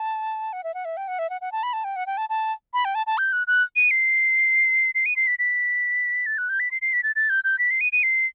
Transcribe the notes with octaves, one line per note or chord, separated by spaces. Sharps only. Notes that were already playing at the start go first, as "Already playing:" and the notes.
Already playing: A5
F#5
E5
F#5
E5
G5
F#5
E5
F#5
F#5
A5
B5
A5
G5
F#5
G5
A5
A5
B5
G5
A5
A5
G6
F#6
F#6
D#7
C7
C7
D#7
C7
B6
B6
A6
F#6
G6
B6
C7
C7
B6
A6
A6
G6
G6
B6
C7
D#7
D#7
C7